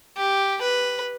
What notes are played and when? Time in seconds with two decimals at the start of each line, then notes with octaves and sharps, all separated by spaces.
0.17 G4
0.61 B4